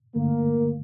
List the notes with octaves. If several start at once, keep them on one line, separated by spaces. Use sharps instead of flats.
G2 D3 A3 A#3